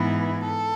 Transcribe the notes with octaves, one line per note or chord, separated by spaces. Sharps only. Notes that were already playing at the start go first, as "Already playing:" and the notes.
Already playing: G#2 E3 B3 E4
A4